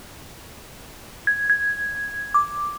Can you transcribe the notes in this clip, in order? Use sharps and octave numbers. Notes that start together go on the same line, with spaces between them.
G#6
G#6
D6